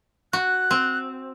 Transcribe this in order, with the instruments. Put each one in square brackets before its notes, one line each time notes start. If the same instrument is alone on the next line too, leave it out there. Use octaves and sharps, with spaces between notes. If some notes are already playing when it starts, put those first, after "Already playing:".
[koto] F#4 [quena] F#6
[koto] C4